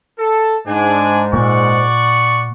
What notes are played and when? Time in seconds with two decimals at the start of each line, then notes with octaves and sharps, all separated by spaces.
0.19 A4 A5
0.67 G#2 D4 G#5
1.33 A#2 D5 F#5 C#6